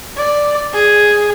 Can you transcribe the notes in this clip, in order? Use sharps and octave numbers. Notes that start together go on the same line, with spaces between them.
D5
G#4